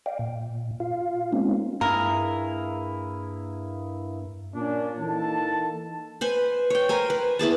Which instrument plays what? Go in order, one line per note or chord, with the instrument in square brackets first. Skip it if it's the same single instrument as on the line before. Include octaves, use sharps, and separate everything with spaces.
[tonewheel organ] D5 D#5 F5 G5
A#2
F4 F5
G#3 A#3 C4 C#4 D#4 F4
[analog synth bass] G2 [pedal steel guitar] A#3 E4 G#4 [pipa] A#4
[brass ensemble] A#2 C#4 D4
E3 A#3 D#4 A4 A5
[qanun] B4 C5 G#5
C#5 G5
A#4 C5 G#5
B4
B3 E4 G#4 A5